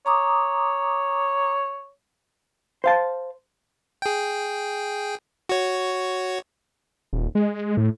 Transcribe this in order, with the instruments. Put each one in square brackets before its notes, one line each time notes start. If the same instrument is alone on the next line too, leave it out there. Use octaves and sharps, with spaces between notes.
[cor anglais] C#5 [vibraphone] A#5 D6 D#6
[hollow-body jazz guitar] C5 F5 A5
[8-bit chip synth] G#4 G5
F#4 C#5
[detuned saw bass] D#1
G#3
A2